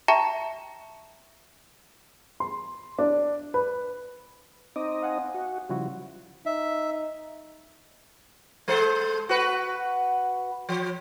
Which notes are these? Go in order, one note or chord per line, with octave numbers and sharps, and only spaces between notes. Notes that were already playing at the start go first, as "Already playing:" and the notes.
E5 G5 A5 A#5 C#6
C6
D4
B4
C4 D#4 D#5 D6
F5 F#5 G#5
F#4
C#3 F3 G3 E4 F#4
D#4 E5
G#3 A4 C5
F#4 B4
F3